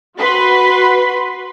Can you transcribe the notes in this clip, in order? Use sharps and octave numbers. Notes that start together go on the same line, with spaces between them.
F#4 B4 B5 C6